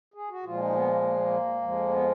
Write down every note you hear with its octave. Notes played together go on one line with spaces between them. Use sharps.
G#4
F#4
A#2 F3 G#3 F4
D#4
B3
A#3
A#3
A#3
F2 F3 G#3
B3